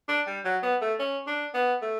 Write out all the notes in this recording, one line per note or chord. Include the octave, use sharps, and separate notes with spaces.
D4
G3
F#3
B3
A3
C#4
D4
B3
A3